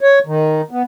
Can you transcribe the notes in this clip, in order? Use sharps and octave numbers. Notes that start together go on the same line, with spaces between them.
C#5
D#3
B3